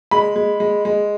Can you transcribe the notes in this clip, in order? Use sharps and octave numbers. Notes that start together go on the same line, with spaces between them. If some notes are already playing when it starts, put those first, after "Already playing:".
G#3 B5
G#3
G#3
G#3